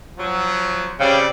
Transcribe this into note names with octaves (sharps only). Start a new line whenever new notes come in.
F3 F#3
C#3 G3 C4 D5